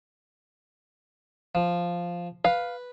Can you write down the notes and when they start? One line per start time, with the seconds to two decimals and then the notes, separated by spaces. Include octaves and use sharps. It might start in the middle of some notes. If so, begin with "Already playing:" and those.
1.55 F3
2.44 B4 F5